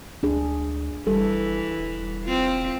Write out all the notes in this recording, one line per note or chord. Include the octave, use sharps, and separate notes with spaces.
D2 D4 G#4
G1 E3 G3 A4
E1
C4 F4